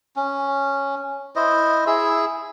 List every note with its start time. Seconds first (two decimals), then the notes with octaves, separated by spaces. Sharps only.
0.16 C#4
1.36 E4 C5 D#5
1.87 E4 G#4 E6